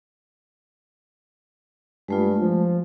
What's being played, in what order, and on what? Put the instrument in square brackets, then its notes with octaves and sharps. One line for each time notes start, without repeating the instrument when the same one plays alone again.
[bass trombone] G2 [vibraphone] G#3 A3 F4
[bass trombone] F3